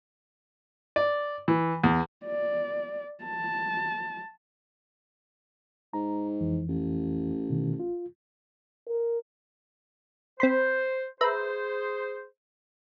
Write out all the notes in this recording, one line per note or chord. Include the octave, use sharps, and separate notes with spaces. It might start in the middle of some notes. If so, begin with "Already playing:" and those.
D5
E3
E2
D5
A5
G#2 A#5
F2 E3
A1
B2 D#3
F4
A#4
C4 C5 B5 C6
G#4 B4 C5 E5 A#5